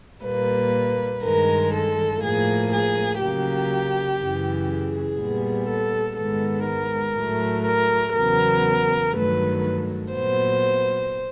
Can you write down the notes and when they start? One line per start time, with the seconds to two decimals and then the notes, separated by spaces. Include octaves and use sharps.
0.24 A#2 G3 A#3 B4
1.23 G2 D#3 G#3 A#4
1.73 A4
2.21 A2 F3 A#3 G#4
2.72 G#4
3.20 C#3 F#3 A#3 G4
4.20 F#2 C#3 E3
4.68 G#4
5.18 A#2 G3 B3
5.68 A4
6.17 G#2 D#3 G#3 B3 A4
6.66 A#4
7.16 A2 F#3 A3
7.65 A#4
8.14 E2 C#3 F#3 B3 A#4
9.13 G2 D#3 F#3 A3 B4
10.12 A#2 F#3 B3 C5